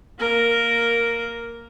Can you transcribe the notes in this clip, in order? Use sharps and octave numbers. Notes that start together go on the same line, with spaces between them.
A#3 A#4